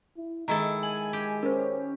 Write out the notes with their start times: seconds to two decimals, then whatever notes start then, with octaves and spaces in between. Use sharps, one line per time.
0.17 E4
0.48 D#3 G#3 E4 A4 A#5
0.83 G#5 F#7
1.13 G4
1.43 C#4 A#4 C5